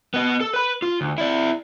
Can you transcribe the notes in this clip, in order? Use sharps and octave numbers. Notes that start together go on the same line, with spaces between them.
B3 D#5
A4
B4 B5
F4
D2
E4 D5